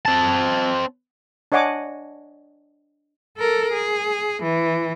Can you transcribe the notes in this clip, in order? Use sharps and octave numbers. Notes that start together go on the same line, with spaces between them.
C4 A5
D4 C#5 D#5 F#5 G#5 D6
A4 A#4
G#4
E3